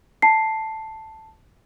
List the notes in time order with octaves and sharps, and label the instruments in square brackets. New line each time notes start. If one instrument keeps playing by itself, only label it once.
[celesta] A5 C7